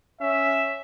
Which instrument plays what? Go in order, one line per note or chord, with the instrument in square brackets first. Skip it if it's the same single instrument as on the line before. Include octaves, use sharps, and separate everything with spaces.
[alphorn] C#4 [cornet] E5